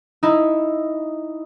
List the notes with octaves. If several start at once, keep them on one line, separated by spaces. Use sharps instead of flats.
D#4 E4